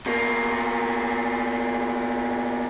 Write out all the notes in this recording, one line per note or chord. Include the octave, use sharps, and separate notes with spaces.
B2 A#3